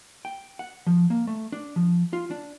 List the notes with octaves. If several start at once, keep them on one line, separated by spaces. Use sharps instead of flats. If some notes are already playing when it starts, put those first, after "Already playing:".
G5
F#5
F3
A#3
A3
D4
F3
F4
D4